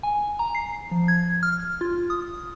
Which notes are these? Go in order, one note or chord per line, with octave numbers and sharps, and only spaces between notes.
G#5
A#5
C7
F3
G#6
F6
F4
D#6